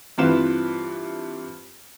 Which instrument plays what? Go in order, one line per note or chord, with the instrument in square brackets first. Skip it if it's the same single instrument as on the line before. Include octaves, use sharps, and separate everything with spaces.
[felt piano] G2 E3 C4 F4 B4 E7